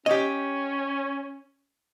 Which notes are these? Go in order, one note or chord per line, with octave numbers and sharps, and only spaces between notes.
C#4 G4 D#5